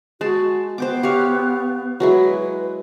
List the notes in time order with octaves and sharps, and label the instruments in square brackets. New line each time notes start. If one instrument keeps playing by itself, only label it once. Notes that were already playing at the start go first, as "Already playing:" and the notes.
[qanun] G#3 A5 [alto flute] F#4
[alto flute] B3 [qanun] C5 G5 D6
[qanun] G4 C#5 F5
[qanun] F#3 G#3 E4 [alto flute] B4